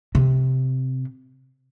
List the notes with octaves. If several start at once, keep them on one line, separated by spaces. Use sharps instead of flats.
C3